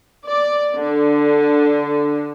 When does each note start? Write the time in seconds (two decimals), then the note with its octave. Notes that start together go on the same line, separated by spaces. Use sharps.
0.23 D5
0.74 D3